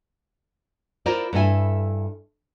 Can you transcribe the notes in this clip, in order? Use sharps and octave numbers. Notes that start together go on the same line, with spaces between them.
E4 F4 A#4 C5 D5
G2 E4 A4 E5 G#5